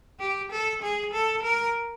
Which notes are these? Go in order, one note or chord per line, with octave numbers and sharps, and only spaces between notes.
G4
A4
G#4
A4
A#4